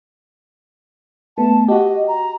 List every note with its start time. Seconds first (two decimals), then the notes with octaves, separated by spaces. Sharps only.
1.38 A3 B3 A5
1.68 F#4 G4 D#5
2.08 A#5